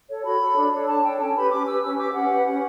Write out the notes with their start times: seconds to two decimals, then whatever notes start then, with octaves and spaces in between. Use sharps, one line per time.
0.09 A4 C#5
0.24 F#4 B5
0.40 A4 C#5
0.56 D4
0.72 A4 C#5
0.88 D4 A5
1.03 A4 C#5 G5
1.19 C#4 A5
1.35 G4 B4 B5
1.50 C#4 D6
1.67 G4 B4 E6
1.82 C#4 E6
1.98 G4 B4 D6
2.14 C#4 F#5
2.29 G4 B4
2.46 C#4